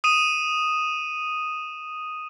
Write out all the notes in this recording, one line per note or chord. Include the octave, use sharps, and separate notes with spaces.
D#6 D#7 E7